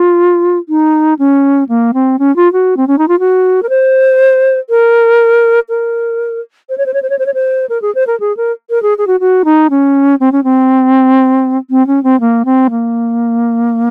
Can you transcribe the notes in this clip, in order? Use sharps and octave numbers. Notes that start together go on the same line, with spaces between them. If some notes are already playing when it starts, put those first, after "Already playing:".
Already playing: F4
D#4
C#4
A#3
C4
C#4
F4
F#4
C4
C#4
D#4
F4
F#4
A#4
C5
A#4
A#4
C5
C#5
C5
C#5
C5
C#5
C5
C#5
C5
A#4
G#4
C5
A#4
G#4
A#4
A#4
G#4
G#4
F#4
F#4
D#4
C#4
C4
C#4
C4
C4
C#4
C4
A#3
C4
A#3